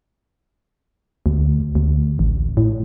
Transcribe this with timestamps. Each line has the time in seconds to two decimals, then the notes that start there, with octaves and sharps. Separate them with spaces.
1.26 D2
1.75 D2
2.19 A1
2.57 A2